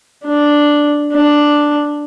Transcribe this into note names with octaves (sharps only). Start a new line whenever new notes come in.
D4
D4